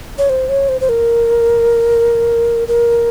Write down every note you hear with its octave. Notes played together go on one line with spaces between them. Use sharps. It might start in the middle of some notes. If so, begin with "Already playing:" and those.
C#5
C5
C#5
C5
C5
A#4
A#4